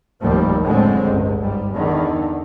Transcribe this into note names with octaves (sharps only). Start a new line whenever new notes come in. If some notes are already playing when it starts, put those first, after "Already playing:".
F1 D#2 A2 F3 G3 A#3
F#2 A2 D3 G#3 C4
G1 C#2
G#2 G3
E2 D3 D#3